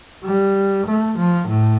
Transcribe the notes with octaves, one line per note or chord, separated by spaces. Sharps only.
G3
A3
F3
A2